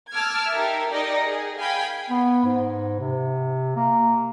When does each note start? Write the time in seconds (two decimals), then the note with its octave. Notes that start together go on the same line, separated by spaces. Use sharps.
0.11 A5 D6 E6 F6 G#6
0.51 D#4 G4 A#4 E5
0.91 D#4 G4 A#4 D5 D#5
1.26 G#4
1.57 F5 G5 G#5 B5
2.10 B3
2.44 G#2
3.00 C3
3.76 A#3